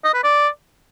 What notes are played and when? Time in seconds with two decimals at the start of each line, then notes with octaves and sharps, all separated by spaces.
0.04 D#5
0.14 B4
0.23 D5